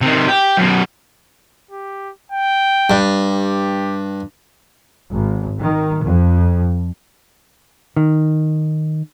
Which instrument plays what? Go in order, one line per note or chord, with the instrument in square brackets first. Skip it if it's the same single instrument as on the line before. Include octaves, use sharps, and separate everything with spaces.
[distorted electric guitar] C3 D#3
G4
F#2 B2
[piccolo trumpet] G4
G5
[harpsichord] G2
[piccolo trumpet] G4
[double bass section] G#1
D#3
F2
[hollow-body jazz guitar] D#3